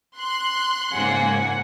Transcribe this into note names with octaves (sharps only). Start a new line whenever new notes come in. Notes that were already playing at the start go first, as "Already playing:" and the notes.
C6 F#6
G#2 C#3 A#3 F#5 G#5